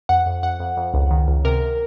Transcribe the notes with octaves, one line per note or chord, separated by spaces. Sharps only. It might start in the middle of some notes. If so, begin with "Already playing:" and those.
F2 F#5
F2
F2 F#5
F2
F2
C#2
D#3
C#2
C3 A#4